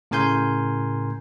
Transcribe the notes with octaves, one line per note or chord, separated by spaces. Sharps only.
A2 C#3 A#4 G#5 C6 G6